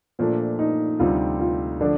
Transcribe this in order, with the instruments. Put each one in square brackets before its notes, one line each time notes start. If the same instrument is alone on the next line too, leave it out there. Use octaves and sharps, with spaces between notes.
[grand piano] A#2 A3 D4 [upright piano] F3
[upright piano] D#4
[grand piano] D2 C3 G3 C4 [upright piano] F4
[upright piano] F4
[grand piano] D3 F3 A3 [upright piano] D4